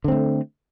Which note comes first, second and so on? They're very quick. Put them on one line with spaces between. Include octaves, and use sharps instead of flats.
D3 C4 A3